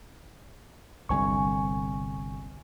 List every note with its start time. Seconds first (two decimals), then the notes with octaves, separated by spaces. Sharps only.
1.09 G1 C2 D3 G#5 C#6